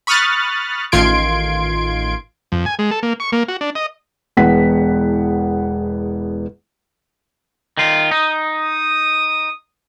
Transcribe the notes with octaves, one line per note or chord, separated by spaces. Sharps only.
B5 C#6 D#6 F6 F#6 A6
A1 D#3 F4 C6 G#6 D7
F2
G#5
G#3
A4
A#3
C#6
A#3
F#4
D4
D#5
E1 E2 B3 F#5 B6
D#3 F4
D#4 D#6
D#6